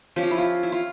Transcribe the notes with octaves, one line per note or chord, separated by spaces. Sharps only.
F3 C#4 G4
F4
E4
F4
E4
F4